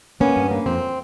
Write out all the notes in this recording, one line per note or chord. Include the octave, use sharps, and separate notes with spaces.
A#3 B3 C#4
G2
A#3
F2 C4